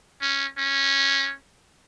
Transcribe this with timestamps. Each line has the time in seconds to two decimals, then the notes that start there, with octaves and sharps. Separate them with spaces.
0.21 C#4
0.57 C#4